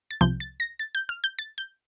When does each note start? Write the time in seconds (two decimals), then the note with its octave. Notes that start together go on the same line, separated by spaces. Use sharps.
0.11 A6
0.21 C2 C3 F3 G6
0.40 A6
0.60 A#6
0.79 A6
0.95 G6
1.09 F6
1.24 G6
1.39 A6
1.58 G6